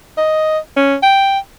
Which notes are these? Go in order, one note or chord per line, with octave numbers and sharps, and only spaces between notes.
D#5
C#4
G5